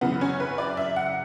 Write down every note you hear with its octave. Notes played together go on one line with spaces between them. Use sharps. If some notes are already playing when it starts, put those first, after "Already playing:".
F#2 C#3 E3 B3
C#4
B4
D5
E5
F#5